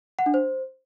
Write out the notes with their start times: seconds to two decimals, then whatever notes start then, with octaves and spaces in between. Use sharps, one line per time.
0.19 F#5
0.26 D4
0.34 C5